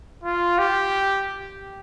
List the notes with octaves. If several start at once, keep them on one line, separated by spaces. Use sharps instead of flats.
F4
G4